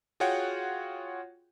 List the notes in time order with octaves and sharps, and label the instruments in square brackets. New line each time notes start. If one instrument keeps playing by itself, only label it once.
[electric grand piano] F4 F#4 G#4 C#5 F#5 G5